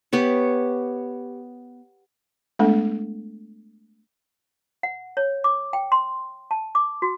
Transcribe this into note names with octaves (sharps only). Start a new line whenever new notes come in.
B3 G4 C#5
G#3 A3 B3 D4 A4
F#5
C#5
D6
G5
C6
A5
D6
F#4